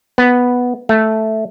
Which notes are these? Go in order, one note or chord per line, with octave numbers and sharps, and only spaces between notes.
B3
A3